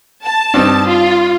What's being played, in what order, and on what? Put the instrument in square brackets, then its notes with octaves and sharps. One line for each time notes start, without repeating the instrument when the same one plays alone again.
[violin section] A5
[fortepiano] G2 C4 D#4
[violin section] F4